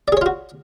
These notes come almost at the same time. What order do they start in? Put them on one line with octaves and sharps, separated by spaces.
D5 G#4 C#5 F4 F#4